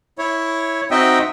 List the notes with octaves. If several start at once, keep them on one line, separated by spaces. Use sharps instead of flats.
E4 C#5
C4 D#4 F#4 D#5 E5 G5